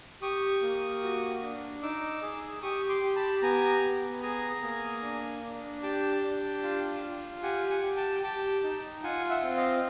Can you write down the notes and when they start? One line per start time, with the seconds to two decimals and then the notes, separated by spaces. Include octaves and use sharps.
0.22 G4 C#6 D#6
0.62 A#3
1.03 F#4
1.42 D4
1.83 D#4 D6 E6
2.22 G#4
2.62 G4 C#6 D#6
2.89 C6 D6
3.03 G4
3.16 A5 B5
3.42 B3 G#5 A#5
3.83 B3
4.23 G#4 G#5 A#5
4.63 A#3
5.02 D4
5.43 D4
5.83 G4 G5 A5
6.23 D4
6.63 F4
7.03 F4
7.43 G4 F#5 G#5
7.70 F#5 G#5
7.83 G4
7.96 G5 A5
8.23 G4 G5 A5
8.64 D#4
9.03 F4 F#5 G#5
9.30 E5 F#5
9.43 C4
9.56 D#5 F5